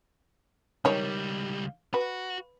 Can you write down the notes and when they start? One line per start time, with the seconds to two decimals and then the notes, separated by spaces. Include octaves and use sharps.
0.85 C#2 D#3 G3 D#4 C#5
1.94 F#4 B4